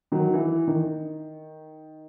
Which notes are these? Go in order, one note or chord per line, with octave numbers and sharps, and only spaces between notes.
D#3 F#3
E3
D#3